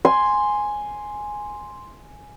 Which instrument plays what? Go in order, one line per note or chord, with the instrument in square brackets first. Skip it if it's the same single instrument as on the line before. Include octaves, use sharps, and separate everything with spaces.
[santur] G#5 C6